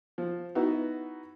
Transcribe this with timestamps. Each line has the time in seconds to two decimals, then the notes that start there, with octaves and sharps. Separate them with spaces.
0.18 F3
0.55 B3 D#4 E4 F#4 B4